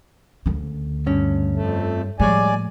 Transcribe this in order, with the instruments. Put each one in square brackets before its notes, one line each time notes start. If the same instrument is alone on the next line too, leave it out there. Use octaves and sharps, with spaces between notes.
[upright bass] D2 C#3
[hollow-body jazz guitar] G2 C#4
[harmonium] F2 A3
[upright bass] A2 F3 [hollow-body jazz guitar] G3 G#3 C#5 [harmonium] D5 G#5